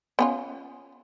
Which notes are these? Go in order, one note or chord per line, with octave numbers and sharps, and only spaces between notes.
B3 C#4 F4